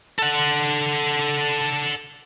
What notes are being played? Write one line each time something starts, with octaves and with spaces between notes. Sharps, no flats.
A4 F#5